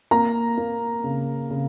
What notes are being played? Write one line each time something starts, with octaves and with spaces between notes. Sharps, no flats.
A#3 A#5
A#3
C#3
C#3